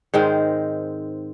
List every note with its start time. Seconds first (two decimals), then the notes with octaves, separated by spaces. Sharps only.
0.14 G#2 D#3 G#3 C4